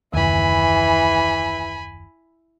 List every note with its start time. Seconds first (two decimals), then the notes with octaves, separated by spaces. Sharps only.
0.14 F#1 D#2 E3 G#5 B5